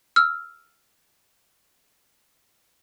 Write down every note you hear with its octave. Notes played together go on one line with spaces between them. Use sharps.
E6 F6